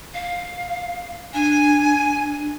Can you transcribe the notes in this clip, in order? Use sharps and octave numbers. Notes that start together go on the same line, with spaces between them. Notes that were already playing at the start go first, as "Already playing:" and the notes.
F5
D4 G#5